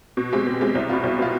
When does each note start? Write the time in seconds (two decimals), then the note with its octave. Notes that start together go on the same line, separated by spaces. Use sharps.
0.17 B2
0.33 G#3 C4 G4
0.46 B2
0.61 G#3 C4 G4
0.75 C2
0.89 B2 B3 F4
1.04 C2
1.19 B2 B3 F4